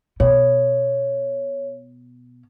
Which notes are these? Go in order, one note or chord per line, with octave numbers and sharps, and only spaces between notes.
B2 C#5